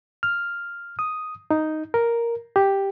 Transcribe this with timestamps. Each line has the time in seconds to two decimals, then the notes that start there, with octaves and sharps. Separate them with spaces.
0.23 F6
0.99 D#6
1.51 D#4
1.94 A#4
2.56 G4